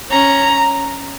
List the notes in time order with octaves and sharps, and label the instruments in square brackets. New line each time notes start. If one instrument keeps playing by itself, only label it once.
[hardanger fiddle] C#4 [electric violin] A#5